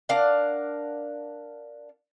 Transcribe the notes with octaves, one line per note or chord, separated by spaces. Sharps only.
D4 A#4 F5 F#5